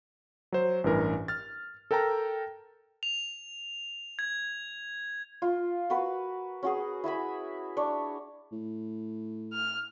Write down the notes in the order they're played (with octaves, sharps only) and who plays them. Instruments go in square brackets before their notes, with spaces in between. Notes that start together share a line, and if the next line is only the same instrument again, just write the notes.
[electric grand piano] F#3 C5
A1 G2 E3 A#4
F6 A6
A4 A#4 G5 A5 A#5
[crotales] F7
G#6
[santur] F4
F#4 A#4 B4
C#4 F#4 G#4
E4 E5 G#5 B5
D4 C#5
[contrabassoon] A2
[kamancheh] F6